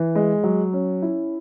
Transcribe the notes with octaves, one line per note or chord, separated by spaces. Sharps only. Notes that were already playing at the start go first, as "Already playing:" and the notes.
Already playing: E3
G#3
F#3
C#4
E4